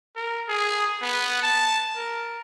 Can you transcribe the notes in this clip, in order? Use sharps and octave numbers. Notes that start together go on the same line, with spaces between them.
A#4
G#4
B3
A5
A#4